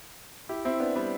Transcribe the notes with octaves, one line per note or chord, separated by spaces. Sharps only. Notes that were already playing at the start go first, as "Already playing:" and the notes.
E4 G4
C4 E4
B3 D4
G3 B3